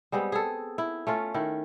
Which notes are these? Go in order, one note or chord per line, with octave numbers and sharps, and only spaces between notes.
G3 G#3 B3 C4
G#4 A4
E4
A3 C#4 F4
D#3 E4